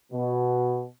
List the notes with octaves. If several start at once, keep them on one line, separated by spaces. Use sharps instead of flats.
B2